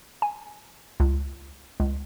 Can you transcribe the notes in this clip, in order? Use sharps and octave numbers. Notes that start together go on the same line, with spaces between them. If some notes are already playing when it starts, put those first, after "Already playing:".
G#5
C#2
C#2